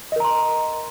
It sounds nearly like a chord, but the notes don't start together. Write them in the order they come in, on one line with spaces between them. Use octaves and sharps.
D#5 A#4 A#5 C6